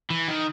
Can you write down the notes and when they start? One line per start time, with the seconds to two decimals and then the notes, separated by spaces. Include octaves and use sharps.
0.10 E3
0.28 D#3